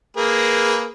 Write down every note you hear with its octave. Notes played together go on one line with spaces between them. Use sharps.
A#3 G#4 B4